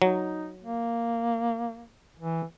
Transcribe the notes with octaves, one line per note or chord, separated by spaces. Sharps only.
F#3 D#4
A#3
E3